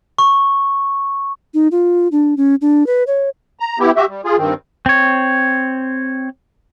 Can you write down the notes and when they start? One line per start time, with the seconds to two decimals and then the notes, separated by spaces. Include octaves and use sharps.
0.19 C#6
1.54 D#4
1.72 F4
2.12 D4
2.37 C#4
2.61 D4
2.87 B4
3.07 C#5
3.60 A#5
3.79 B3 E4 G4
3.96 F#4 G4 E5
4.08 G3
4.24 F4 G#4
4.38 G2 D#3 C4
4.86 C4 C#5